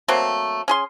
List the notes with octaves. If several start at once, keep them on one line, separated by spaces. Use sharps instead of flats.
F#3 A3 A#3 C4
C#4 G#4 C6